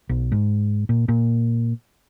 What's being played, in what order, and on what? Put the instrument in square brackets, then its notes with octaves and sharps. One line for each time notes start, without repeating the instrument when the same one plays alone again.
[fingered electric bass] B1
G#2
A#2
A#2